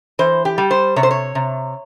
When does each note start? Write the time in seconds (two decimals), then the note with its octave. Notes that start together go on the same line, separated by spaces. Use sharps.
0.19 E3 C5
0.45 G4
0.58 G3
0.71 C5
0.96 C3 C#5
1.03 C5
1.11 C#5
1.35 C3